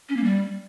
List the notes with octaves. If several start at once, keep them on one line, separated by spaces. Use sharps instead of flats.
C#4
A#3
G3